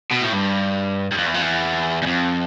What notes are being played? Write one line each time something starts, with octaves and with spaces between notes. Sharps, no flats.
B2
A2
G2
G2
F2
E2
F2
E2
E2
F2